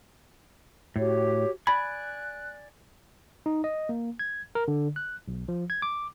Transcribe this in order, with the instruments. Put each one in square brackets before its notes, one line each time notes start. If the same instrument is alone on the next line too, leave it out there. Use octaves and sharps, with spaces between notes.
[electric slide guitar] A2 [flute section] F#4 G4 C#5
[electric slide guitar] D5 G#5 [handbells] B5 [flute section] F#6
[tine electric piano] D#4
D#5
A#3
G#6
A#4
D3
F#6
B1
F3
G#6
D6